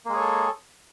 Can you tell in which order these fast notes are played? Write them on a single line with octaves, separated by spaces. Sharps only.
A#3 G#3 G#4 C#5 A4